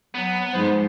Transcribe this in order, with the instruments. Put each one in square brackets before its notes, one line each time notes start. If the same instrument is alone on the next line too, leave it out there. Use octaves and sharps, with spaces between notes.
[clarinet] F#3 [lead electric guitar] B3
[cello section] G#2 F3 G#3 [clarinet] C5